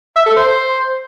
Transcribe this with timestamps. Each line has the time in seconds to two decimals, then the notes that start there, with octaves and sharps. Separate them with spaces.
0.16 E5
0.26 A4
0.36 C5